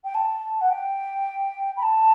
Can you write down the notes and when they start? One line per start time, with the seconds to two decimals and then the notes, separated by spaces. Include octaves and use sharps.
0.04 G5
0.14 A5
0.60 F#5
0.70 G5
1.76 B5
1.82 A5